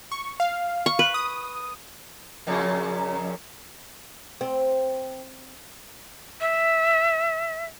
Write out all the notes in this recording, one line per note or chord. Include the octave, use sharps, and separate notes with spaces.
C#6
F5
C#6
B4
D#6
F2 A#2 C#3
C4
E5